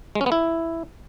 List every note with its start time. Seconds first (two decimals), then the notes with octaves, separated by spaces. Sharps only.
0.15 G#3
0.21 C#4
0.26 B3
0.32 E4